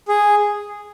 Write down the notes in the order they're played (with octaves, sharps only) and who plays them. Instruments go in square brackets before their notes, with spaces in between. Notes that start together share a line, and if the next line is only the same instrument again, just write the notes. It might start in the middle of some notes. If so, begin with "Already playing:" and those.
[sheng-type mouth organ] G#4